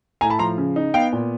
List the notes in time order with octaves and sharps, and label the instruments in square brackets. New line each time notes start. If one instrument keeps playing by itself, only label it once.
[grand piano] A2 G#5 A#5
A5 B5
F3 A#5 C6
C#3
D#4
B3 F5 G5
A#2